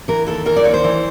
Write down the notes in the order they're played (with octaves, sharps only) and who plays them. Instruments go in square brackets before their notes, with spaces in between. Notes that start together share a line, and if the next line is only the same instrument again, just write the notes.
[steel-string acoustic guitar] E3 A#4
D#2 A4
E3 A#4
D5
D#2 C#5
C5
E3